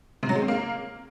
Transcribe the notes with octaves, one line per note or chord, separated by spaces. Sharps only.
C3
F#3
G#3
C4
A#3